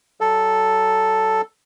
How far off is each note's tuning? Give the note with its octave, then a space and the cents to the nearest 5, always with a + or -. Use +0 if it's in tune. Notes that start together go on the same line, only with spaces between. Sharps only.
F#3 +30 A4 +0